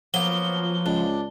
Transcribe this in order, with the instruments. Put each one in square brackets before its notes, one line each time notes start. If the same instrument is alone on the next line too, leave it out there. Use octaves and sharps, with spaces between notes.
[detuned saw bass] F3 [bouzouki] F#3 A#3 B3 [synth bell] G7
[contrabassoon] C#2 [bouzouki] D4